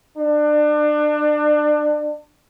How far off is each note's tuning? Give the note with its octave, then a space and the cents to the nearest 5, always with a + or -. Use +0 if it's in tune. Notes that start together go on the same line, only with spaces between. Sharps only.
D4 +30